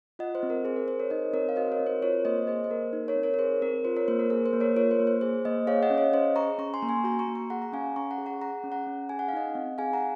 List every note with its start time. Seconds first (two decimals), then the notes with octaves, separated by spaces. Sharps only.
0.19 F4 D#5 F#5
0.35 C5
0.43 C4
0.50 A#4
0.65 G#4 C5
0.76 A#4
0.87 C4 C5
0.99 A#4 C#5
1.10 D#4 C5 D#5
1.33 C4 A#4 C#5
1.49 F5
1.56 F#4 C5 D#5
1.72 A#4 C#5
1.80 C4
1.87 C5
2.02 F4 A#4 C#5
2.25 A#3 C5 D#5
2.47 G#4 C5 D#5
2.64 C5
2.70 A#3 A#4
2.93 D#4
3.08 A#4 C#5
3.16 C4
3.23 A#4 C#5
3.34 A#4
3.39 G#4 C5
3.62 C4 A#4
3.85 F4 C5
3.96 A#4 C#5
4.08 A#3 C5
4.19 A#4
4.30 G#4 A#4
4.46 C5
4.53 A#3
4.61 A#4 C#5
4.76 F4 A#4 C#5
4.91 C5
5.00 A#3
5.07 C5
5.21 G#4 C5
5.45 A#3 C5 D#5
5.67 G#4 C#5 F5
5.82 D#5 F#5
5.90 C#4
5.98 C#5 F5
6.13 C#4 C5 D#5
6.35 G#4 A#5 C#6
6.58 C#4 A#5 C#6
6.74 G#5 C6
6.82 A#3 A#5
6.89 G#5 C6
7.04 F#4 A#5 C#6
7.19 A#5 C#6
7.28 A#3
7.35 A#5 C#6
7.50 G#4 F#5 A#5
7.62 A#5
7.72 C#4 F5 G#5
7.96 C#4 A#5 C#6
8.11 F#5 A#5
8.18 G#4
8.26 F#5 A#5
8.41 G#4 F#5 A#5
8.64 C#4
8.72 F#5 A#5
8.87 C#4
9.09 G#4 G#5
9.19 F#5
9.28 F5
9.33 D#4 D#5 F#5
9.55 C4
9.78 G#4 F5 G#5
9.93 F#5 A#5